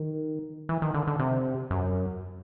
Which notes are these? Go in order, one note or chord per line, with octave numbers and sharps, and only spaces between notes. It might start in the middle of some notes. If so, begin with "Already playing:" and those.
Already playing: D#3
E3
D#3
D3
D3
C3
F#2